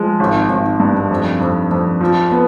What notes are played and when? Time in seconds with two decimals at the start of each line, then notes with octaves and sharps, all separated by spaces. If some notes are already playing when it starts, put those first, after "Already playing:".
Already playing: F3 G#3
0.20 G#1
0.49 G#1
0.80 G2
1.11 F2
1.41 F2
1.71 F2
2.01 F3
2.32 B3